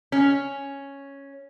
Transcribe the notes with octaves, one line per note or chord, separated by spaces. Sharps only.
C#4